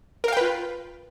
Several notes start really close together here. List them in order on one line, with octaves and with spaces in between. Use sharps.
A#4 F5 G5 B4 F4